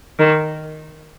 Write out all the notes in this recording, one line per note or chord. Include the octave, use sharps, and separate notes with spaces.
D#3